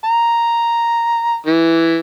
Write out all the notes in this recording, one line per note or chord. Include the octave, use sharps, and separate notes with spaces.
A#5
E3